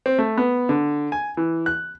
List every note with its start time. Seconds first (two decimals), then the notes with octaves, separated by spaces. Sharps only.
0.06 C4
0.18 A3
0.38 B3
0.69 D3
1.12 G#5
1.37 E3
1.66 F#6